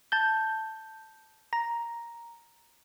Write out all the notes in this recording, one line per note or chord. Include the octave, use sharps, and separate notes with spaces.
A5 G6
A#5